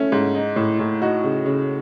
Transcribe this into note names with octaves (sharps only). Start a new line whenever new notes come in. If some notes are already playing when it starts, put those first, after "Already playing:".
Already playing: A3 C#4 E4
G#2
D#4
A2
A2
D#4 F#4
C#3
C#3